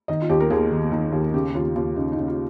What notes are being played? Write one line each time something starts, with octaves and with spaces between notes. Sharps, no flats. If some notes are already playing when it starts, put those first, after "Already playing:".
D#3 D#5
F4
D#2 G4
A#4
D#2 G#4
D#3
D#3
D#2
C#3 G4
D#2 F4
D#2 F4
C#3 D#4
D#4
C#3
F4